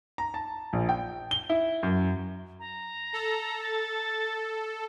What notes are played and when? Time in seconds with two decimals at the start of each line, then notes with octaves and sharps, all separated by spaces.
0.18 A#5
0.34 A5
0.73 A#1
0.89 G5
1.31 G7
1.49 E4
1.83 F#2
2.60 A#5
3.13 A4
3.63 A6